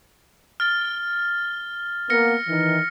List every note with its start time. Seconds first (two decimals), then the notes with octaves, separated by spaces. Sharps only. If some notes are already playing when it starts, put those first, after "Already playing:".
0.60 F6 A6 G7
2.10 A#3 B3 F6 A#6 C#7
2.48 D#3 E3